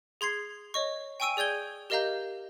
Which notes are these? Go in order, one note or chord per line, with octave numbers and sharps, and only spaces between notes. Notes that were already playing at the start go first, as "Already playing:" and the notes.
G#4 C6 G#6 C7
C#5 D#5 C#6
G5 G#5 C#6 E6 D7 D#7
G#4 D5 G6 G#6 G7
G4 A#4 D#5 F5 A#5 G6